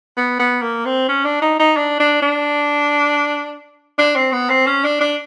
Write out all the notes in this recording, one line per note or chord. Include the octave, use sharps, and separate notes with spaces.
B3
B3
A#3
C4
C#4
D4
D#4
D#4
D4
D4
D4
D4
C4
B3
C4
C#4
D4
D4